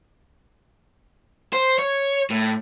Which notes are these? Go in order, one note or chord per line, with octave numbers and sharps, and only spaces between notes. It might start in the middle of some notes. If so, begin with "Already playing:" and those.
C5
C#5
A2